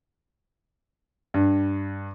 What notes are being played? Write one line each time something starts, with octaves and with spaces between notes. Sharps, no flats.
G2